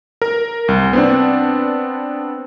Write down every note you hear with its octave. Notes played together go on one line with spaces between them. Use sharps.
A#4
C2
B3 C4 D4